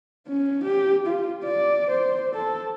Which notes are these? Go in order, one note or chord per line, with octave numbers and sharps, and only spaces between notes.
C#4
G4
F4
D5
C5
A4